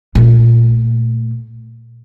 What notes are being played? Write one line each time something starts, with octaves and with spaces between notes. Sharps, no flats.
A#2 A3